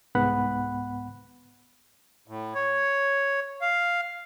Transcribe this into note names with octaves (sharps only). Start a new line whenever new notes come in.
C2 G#2 B3 F#5 B5 F#6
A2
C#5
F5